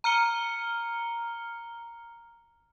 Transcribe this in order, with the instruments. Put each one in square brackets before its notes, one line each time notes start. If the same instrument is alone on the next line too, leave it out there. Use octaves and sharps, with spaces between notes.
[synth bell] A#5 F6 C#7 G7